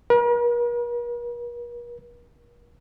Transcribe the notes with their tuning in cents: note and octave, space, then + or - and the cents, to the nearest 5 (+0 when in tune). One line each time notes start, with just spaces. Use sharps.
A#4 +45